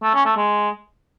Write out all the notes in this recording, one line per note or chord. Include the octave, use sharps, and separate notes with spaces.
A3
C#4
A3
G#3